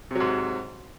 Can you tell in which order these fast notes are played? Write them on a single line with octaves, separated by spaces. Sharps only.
C3 F#3 G#2